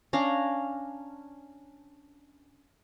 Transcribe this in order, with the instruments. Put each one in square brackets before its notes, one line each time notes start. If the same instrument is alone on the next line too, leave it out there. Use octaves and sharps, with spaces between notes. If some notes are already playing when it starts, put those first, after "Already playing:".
[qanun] C#4 D4 F5 A#5